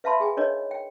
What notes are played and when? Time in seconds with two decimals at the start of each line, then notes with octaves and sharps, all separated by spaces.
0.04 B4 E5 F5 A5 B5 C6
0.20 G#4 G5 G#5
0.37 D4 D#4 A#4 C#5 D#5
0.71 G5